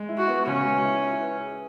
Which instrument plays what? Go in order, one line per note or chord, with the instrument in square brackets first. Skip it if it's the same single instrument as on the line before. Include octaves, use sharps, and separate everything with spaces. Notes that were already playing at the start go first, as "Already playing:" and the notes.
Already playing: [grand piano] G#3
E4
[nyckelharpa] F#4
[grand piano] B3
[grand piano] C#3 [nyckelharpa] C#4
[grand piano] G#3
E4
E4
B4
G#4